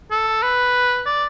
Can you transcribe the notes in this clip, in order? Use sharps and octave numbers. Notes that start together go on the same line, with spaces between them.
A4
B4
D5